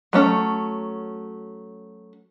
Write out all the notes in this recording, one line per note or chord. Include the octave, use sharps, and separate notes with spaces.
F#3 A3 C#4